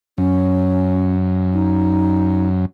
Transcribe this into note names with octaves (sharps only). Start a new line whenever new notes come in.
F#2 C#4
D#4